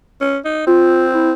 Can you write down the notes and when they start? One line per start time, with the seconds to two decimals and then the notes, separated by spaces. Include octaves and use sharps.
0.21 C#4
0.45 D#4
0.67 C4 F4
1.14 E4